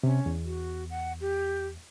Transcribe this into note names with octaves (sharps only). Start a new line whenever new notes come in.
C3 C#4
E2
F#4
F#5
G4